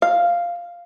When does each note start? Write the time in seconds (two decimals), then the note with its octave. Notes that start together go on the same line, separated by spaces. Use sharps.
0.02 F5